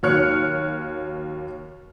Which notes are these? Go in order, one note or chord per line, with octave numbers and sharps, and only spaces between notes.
D#2 F#3 C#5 F6 F#6 C#7